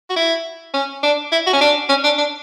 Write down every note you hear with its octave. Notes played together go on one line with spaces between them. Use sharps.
F#4
E4
C#4
D4
E4
F#4
C#4
D4
C#4
D4
D4